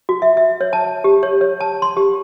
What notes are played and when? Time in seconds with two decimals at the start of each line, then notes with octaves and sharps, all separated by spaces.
0.09 F#4
0.22 E5
0.37 E5
0.61 C#5
0.73 A5
1.04 G4
1.23 C#5
1.41 C#5
1.60 A5
1.82 C6
1.97 G4